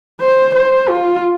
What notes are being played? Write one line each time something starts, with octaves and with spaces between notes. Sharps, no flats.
C5
C5
F4